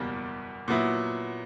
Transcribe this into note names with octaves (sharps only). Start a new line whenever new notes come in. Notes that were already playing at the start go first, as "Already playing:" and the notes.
Already playing: F#1 E2 B2 G3 A#3
A#2 F#3 B3 E4